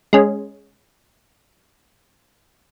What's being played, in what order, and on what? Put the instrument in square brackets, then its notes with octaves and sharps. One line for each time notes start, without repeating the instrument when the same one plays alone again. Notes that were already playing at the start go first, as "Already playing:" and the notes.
[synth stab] G#3 C#4